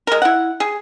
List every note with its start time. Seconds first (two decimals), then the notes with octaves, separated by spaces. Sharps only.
0.07 G#3 A#4
0.22 E4 F#5
0.60 G#4